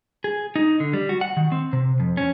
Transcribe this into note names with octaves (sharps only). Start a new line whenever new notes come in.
G#4
D#4
D3
G3
F#4
F#5
D#3
C4
C3
F2
C#4